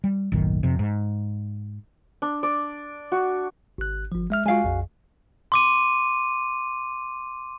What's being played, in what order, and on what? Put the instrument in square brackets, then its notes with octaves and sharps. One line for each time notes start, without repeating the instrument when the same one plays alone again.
[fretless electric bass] G3
F#1 B1 A2 D#3
F2 C3
G#2
[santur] D4
D5
F#4
[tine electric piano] G#1 F#6
G1 F3
G#3 E5 F6
[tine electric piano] G#3 F4 [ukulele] F#4 F5 G#5
[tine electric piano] A#1 F2
[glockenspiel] C6 D6 D#7